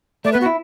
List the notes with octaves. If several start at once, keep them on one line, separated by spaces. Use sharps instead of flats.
A3 D5
B3 B4
F#4
E4